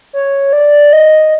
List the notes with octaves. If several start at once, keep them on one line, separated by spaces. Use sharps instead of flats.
C#5
D5
D#5